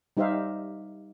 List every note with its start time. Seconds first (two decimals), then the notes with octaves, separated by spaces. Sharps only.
0.17 G3 D#4 G4 C5 E5 F5